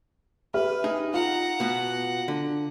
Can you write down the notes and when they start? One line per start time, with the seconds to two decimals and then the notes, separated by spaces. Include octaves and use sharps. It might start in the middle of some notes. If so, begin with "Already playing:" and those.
0.54 G4 B4 E5 F6
0.84 D#4 G#4
1.14 F4 F#5 A#5
1.60 B2 B3
2.28 D3